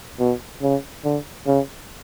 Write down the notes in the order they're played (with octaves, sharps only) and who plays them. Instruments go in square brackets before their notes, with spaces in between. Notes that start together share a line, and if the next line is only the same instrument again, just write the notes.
[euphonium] B2
C#3
D3
C#3